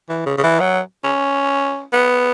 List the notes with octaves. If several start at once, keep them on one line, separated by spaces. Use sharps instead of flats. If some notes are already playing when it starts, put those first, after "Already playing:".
E3
C#3
C#3
E3
F#3
C#4
B3